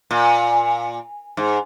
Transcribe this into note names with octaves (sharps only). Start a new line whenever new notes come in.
A#2
G#2